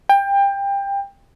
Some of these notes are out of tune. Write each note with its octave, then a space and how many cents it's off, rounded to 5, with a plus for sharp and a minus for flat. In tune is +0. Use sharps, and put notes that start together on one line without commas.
G5 +25